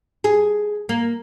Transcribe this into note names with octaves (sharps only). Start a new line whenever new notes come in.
G#4
A#3